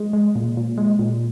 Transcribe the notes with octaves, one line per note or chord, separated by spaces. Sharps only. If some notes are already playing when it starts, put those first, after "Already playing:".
Already playing: G#3
G#3
A#2
A#2
G#3
A#2